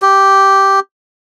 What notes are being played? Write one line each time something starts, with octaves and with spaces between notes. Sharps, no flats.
G4